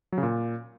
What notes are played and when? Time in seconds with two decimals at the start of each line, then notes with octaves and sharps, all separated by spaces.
0.12 F#3
0.18 C#3
0.23 A#2